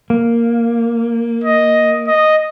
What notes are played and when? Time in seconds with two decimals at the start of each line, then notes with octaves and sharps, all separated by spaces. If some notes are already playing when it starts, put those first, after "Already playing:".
0.10 A#3
1.44 D#5
2.07 D#5